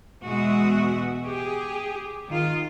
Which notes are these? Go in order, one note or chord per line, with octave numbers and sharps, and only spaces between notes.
E2 B2 G#3 F#4 E5
G4 G#4
D#3 F4